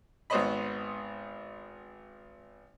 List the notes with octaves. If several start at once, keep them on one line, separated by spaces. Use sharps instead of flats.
G#1 B3 C5 C#5 D#5 B5